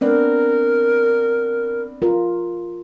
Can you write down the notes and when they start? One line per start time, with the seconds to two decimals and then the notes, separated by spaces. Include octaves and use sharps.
0.01 B3 C4 D4 A#4
2.02 F4 A#4